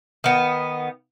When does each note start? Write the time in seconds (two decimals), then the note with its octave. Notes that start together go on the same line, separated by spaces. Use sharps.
0.24 D#3 B3